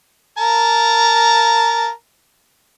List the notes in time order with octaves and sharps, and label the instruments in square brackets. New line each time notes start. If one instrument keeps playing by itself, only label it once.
[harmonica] A#4 A5 A#5